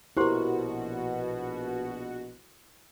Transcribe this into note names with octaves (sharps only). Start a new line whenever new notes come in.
A#1 B2 E4 F#4 G4 A#4 C5 C6